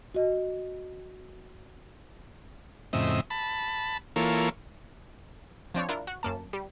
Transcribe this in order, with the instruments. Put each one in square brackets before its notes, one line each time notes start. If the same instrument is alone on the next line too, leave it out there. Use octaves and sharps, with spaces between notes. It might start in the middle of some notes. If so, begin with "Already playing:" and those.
[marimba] F#4 D#5
[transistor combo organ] F2 A2 C#3 C4 D#5 E5
A5 B5
E3 A#3 F4 A4 A#4 C#5
[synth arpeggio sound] F3 C4 D4 C#5
D4 E4 F4 A#4
F#4
F#2 A#3 A5
G3